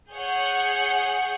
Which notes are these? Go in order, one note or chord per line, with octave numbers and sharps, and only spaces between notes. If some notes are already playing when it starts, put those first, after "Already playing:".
G#4 C#5 F#5 G6